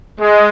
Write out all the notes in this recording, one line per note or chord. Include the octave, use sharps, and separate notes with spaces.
G#3